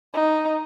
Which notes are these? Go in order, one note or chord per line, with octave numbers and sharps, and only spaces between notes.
D#4